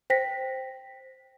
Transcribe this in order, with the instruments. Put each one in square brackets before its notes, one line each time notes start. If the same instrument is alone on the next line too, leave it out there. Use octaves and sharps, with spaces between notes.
[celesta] C5 G5 A#6 B6